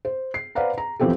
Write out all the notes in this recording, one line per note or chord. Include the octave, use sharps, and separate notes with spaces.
C5
C7
B4 C5 D5 F5 F#5 A#5
A#5
E3 F3 B3 C4 G4 A4